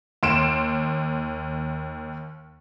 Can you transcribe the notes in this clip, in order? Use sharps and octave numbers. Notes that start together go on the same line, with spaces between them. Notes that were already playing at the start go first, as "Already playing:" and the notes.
D#2 C6 D7 E7